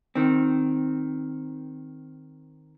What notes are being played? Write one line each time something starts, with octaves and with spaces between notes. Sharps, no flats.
D#3 C4